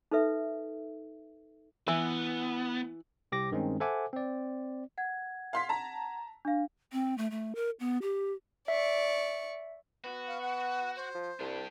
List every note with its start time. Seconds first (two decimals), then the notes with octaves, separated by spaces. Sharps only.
0.11 D#4 A4 B4 E5
1.88 E3 B3
3.32 C2 G4 D6 A#6
3.51 G2 D#3 G#3 C4 C#4
3.80 A4 C5 E5 F#5 G#5 D6
4.13 C4 D5
4.98 F#5 G#6
5.53 F5 C6 B6
5.69 A5 A#5
6.45 D4 F5
6.92 C4
7.18 A3
7.31 A3
7.55 A#4
7.80 B3
8.02 G4
8.68 D5 E5 C#6
10.04 B3 F#4
10.27 F5
10.42 F#5
10.96 C5
11.15 F3
11.40 C2 D4 G4